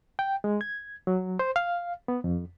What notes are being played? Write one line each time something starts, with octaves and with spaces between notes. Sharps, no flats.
G5
G#3
G#6
F#3
C5
F5
B3
F2